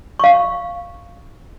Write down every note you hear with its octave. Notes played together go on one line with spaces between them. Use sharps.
F5 C#6